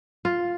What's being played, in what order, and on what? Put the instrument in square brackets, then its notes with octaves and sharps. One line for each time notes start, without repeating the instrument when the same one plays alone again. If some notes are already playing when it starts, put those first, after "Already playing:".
[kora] F4